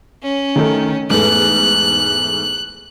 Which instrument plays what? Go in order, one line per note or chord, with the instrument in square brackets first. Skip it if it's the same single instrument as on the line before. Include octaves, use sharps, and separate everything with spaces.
[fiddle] C#4
[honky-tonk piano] D#3 A3 D#4
[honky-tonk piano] E2 G#2 A3 [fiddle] F#6